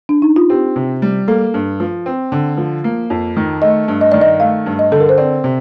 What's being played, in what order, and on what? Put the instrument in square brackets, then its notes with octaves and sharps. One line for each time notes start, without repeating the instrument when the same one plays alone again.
[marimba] D4
D#4
F4
[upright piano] C4 [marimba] G4
[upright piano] C3
G3
[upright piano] A#3 [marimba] A4
[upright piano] G2
F3
C4
D3
F3
A#3
F2
D#3
[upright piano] A3 [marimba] D#5
[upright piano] G2
[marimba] D#5
[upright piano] D#3 [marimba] D5
[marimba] D#5
[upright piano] A3 [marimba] F5
[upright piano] G2
[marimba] D#5
[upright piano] D3 [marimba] A4
[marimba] A#4
C5
[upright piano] C4 [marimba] D5
[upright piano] C3